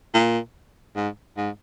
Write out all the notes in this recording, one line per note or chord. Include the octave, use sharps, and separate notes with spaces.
A#2
G#2
G#2